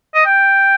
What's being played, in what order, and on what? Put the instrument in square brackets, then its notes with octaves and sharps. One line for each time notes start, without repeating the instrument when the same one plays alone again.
[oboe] D#5
G5